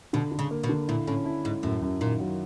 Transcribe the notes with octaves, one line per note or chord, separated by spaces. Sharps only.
B2 D3
D3
C#3
A#3
B2
D3
A#2 E4
A2 C#4
E4
G#2 E4
F#2 A2
F#2
A#2 D#3
F#3